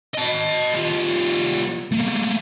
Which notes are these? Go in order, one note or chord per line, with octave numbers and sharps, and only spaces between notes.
D#5 A5
G3 F4
A3 A#3